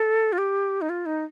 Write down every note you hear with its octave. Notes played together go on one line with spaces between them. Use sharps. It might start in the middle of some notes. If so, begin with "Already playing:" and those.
Already playing: A4
F4
G4
D#4
F4
D#4